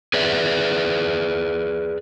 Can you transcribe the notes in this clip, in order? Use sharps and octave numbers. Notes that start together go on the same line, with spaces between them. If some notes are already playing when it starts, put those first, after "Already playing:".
G#4 B4 D5 E5